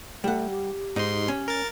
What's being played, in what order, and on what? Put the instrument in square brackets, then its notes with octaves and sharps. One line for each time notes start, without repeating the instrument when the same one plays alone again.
[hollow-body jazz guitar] G3 F#5 [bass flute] A3
[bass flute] G4
[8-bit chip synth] G#2 C6 [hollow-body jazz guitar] D#4
[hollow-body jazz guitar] C#4
[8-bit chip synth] A#4 A6